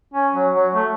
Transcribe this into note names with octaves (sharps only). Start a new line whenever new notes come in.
C#4
F#3
F#3
A3